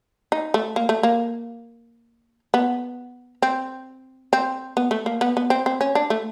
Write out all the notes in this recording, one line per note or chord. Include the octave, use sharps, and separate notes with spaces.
D#4
A3
A#3
A3
A#3
B3
C4
C4
B3
A3
A#3
B3
B3
C4
C4
C#4
D4
A3